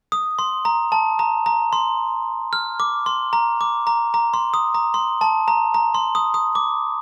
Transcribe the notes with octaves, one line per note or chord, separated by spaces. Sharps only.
D#6
C6
A#5
A5
A#5
A#5
C6
F6
D6
C6
A#5
D6
A#5
A#5
C6
D#6
A#5
C6
A5
A#5
A#5
C6
D#6
D#6
D6